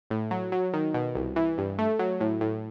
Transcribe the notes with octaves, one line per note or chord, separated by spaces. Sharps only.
A2
F#3
F#3
D#3
B2
C2
E3
G2
A3
F#3
A2
A2